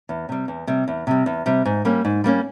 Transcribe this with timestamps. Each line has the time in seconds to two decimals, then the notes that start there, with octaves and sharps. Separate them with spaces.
0.09 E2
0.29 C3 G3
0.48 E2
0.67 C3 G3
0.88 E2
1.07 C3 G3
1.26 E2
1.46 C3 G3
1.65 G#2
1.85 G3 A#3 C#4
2.05 G#2
2.24 G3 A#3 C#4